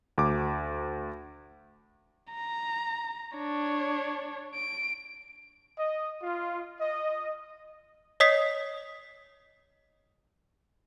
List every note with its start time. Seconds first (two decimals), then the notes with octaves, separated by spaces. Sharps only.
0.18 D2 D6
2.32 A#5
3.37 D4 C#5
4.55 D7
5.77 D#5
6.22 F4
6.79 D#5
8.20 C#5 D#5 D#6 B6 C7